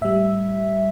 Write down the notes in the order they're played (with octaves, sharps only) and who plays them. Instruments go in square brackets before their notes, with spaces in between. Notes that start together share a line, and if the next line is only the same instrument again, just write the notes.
[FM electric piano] A2 G3 E5